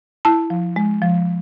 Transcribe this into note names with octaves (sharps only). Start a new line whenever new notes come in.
E4 A5
F3
G#3
F3